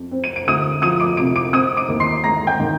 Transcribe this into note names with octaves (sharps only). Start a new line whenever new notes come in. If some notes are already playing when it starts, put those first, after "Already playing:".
Already playing: F2
C4
D#7
D7
D2 D#6 D#7
F3 D#6 D#7
D6 D7
C3 D6 D7
D6 D7
C4 D#6 D#7
D6 D7
D#2
C6 C7
G#3 A#5 A#6
G5 G6
D#3